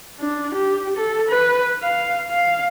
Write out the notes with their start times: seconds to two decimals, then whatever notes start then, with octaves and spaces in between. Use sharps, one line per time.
0.20 D4
0.55 G4
0.96 A4
1.29 B4
1.82 F5
2.31 F5